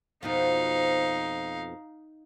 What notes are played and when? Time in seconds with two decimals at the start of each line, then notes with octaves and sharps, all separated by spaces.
0.23 F2 B2 F3 D#4 F5